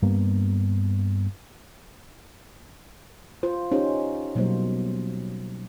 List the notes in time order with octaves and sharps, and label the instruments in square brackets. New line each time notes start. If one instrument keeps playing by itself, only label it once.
[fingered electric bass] G2 G3 A#3 B3
[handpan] F4 C5
C#4 D#4 G4 C5
B2 F#3 G3 A#3 C5